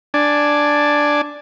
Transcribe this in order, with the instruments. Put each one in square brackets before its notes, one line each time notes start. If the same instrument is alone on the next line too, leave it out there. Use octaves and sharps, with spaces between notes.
[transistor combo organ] D4 D5 G#5 A5